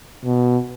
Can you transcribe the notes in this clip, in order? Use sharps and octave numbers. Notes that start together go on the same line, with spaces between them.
B2